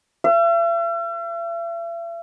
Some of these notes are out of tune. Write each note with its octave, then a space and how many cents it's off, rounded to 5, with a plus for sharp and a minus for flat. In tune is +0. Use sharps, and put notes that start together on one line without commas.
E5 +45